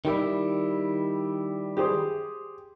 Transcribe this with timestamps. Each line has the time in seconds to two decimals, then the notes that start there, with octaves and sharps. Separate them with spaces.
0.05 D#3 G3 E4
1.77 G4 G#4 C5